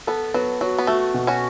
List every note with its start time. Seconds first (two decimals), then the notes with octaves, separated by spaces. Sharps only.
0.07 B3 A4
0.34 F#3 B3
0.61 F#3 F#4
0.78 B3
0.87 A3 F#4
1.14 B2
1.27 C#4 F#4